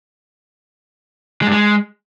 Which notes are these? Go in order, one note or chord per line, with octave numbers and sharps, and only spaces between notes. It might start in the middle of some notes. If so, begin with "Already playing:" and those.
G#3
G2
G#3